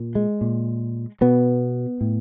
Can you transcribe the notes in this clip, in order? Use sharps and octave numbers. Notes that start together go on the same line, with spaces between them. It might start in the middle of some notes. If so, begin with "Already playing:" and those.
Already playing: A#2
G#3
A#2
B2 B3
A2